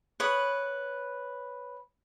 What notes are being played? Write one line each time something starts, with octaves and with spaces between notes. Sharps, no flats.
B4 C#5 B5 D#6